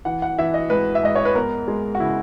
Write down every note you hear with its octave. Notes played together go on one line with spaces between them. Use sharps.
E3 F#5
F#5
E3 E5
D#5
G#2 B4
E5
G#2 D#5
C#5
B4
B3 A#4
G#3
F#4
C#3 E4